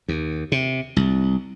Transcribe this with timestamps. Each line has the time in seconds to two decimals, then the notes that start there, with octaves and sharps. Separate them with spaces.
0.08 D#2
0.52 C3
0.96 C2